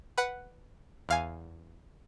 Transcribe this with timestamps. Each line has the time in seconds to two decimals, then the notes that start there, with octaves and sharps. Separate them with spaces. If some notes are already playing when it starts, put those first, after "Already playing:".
0.18 B4 F#5
1.09 E2 F5 G#5